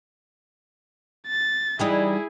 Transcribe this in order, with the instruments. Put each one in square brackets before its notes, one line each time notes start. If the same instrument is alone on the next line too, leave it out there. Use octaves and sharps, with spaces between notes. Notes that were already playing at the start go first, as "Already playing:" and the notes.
[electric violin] A6
[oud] E3 G3 D#4 [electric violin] E4 G#4